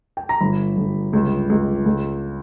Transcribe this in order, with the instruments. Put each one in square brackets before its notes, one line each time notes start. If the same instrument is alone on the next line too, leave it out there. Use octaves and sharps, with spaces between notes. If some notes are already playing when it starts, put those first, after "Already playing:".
[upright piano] G5
A#5
G1 B5
G1
C#2
C#2
C#2